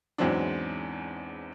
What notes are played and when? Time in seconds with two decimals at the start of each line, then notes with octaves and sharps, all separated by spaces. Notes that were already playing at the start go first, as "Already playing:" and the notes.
0.18 E2 G#2 E3 F#3 C4 D4